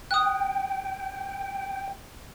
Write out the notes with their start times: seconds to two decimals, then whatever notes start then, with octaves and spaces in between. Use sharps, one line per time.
0.11 G5 D#6 F#6